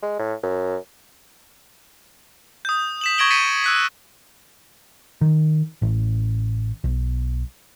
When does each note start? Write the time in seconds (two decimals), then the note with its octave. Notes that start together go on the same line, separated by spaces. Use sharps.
0.03 G#3
0.19 A2
0.43 F#2
2.65 D#6 G6
3.01 B6 E7 F#7
3.18 C#6 G#6 A#6 D7 F#7 G7
3.31 A6 B6 C#7 D#7
3.64 E6 F#6 B6
5.21 D#3
5.82 A1
6.84 B1